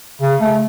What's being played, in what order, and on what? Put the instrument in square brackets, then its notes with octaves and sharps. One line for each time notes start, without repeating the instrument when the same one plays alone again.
[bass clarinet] C#3
A3